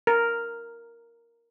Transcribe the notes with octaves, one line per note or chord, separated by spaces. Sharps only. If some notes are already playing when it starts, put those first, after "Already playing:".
A#4